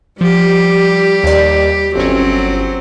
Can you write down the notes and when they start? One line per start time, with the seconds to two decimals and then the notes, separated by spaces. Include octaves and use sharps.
0.21 F3 G3 G4
1.23 D#2 D5
1.95 G1 F#3 C4 C#4